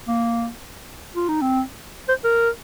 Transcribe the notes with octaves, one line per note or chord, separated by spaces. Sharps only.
A#3
F4
D#4
C4
C5
A#4